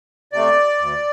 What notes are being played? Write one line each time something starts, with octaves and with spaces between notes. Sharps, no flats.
C3 A3 D5
D2